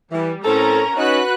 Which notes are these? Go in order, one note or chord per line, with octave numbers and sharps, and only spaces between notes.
E3 G3
A2 C4 C#4 A4 A#4 A#5
C#4 D#4 F#4 B4 F#6